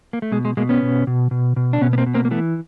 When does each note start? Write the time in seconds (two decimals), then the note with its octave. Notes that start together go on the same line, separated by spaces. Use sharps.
0.13 A#3
0.22 A3
0.32 B2 G#3
0.45 G#3
0.57 B2 G#3 A#3
0.69 B3 C#4
0.82 B2
1.07 B2
1.31 B2
1.56 B2
1.73 D4
1.81 B2 B3 C#4
1.93 B3
1.98 A#3 C4
2.06 B2
2.14 A#3 C4
2.25 A#3
2.31 E3 A3 B3